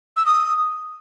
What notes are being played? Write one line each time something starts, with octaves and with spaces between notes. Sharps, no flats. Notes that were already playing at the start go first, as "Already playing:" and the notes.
E6
D#6